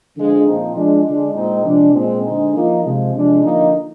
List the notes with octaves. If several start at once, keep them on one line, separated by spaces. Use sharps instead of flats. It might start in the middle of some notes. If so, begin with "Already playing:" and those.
D3 F3 G#3
A#2 F3 C4 D#4
F3 G#3 D4
D3 G#3 D4
A#2 G#3 C4 D#4
C3 F3 G#3 D4
A#2 G#3 C4
D3 G#3 C4 D#4
F3 A#3 D#4
C3 F3 G#3
C3 F3 G#3 D4
D3 F3 A#3 D#4